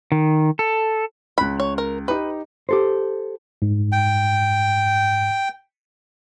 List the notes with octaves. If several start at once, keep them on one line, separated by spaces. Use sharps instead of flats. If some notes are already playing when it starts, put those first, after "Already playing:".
D#3
A4
C#2 B5 F#6
C#5
A#4
D#4 G4 B4
G4 A4 C5
G#2
G5